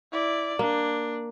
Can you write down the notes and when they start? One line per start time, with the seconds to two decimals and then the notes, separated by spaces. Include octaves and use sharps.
0.12 E4 D5
0.59 A#3 D4